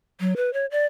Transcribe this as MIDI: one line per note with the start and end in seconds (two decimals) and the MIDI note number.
0.20 0.34 54
0.36 0.52 71
0.53 0.66 73
0.71 0.86 74